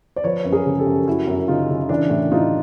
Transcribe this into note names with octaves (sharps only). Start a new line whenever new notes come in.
D5
F3 B4 C#5
F#2
G#4 A#4
C#3
G4 A4
F#2
F#2 E4 F#4
F#2
C#3 D#4 F4
C#3
E3 D4 E4
A2
A2 D#4 F4